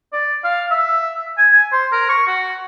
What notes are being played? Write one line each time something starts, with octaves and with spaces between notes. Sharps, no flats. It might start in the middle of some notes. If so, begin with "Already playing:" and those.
D5
F5
E5
G#5
G#5
C5
A#4
C#6
F#4